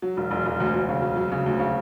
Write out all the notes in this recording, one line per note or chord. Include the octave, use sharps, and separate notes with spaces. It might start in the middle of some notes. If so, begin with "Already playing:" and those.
F#3
E1
E1
E1
D2
F#3
C#3
F#3
F#3
C#3
D2
C#3